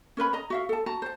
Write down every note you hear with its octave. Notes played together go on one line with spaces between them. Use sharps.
C#4 A#4 B4 B5
D#5 A#5
F#4 E5 F5
A4 A5
F#4 A5 A#5
C5 A5